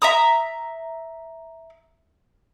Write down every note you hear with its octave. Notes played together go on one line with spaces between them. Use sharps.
E5 A#5 D#6